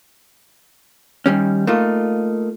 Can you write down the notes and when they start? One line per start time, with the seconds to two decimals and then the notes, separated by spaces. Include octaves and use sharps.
1.26 D#3 G3 C#4
1.67 A3 A#3 D#4 F4